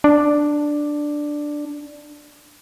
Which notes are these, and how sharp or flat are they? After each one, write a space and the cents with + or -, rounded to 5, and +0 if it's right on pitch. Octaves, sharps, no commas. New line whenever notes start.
D4 +5